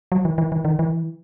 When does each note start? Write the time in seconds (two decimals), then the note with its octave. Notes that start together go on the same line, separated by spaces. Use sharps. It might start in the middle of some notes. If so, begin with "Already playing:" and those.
0.12 F#3
0.25 E3
0.38 E3
0.52 E3
0.65 D#3
0.79 E3